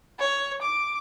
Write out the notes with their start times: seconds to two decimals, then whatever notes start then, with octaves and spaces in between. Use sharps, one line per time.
0.20 C#5
0.62 D6